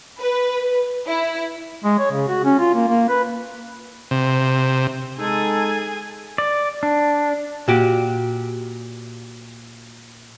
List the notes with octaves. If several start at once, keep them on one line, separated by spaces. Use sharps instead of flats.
B4
E4
G#3
C#5
C#3
F#4
C#4
F4
A#3
A#3
B4
C3
G#3 D#4 G#4 A4 G#5
D5
D4
A#2 F#4 G4